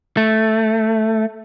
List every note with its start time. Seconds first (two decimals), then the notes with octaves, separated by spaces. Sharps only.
0.17 A3